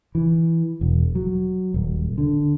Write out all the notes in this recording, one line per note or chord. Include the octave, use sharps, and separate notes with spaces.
E3
E1
F#3
D#1
D3